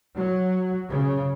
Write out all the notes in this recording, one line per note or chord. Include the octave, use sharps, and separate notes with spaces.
F#3
C#3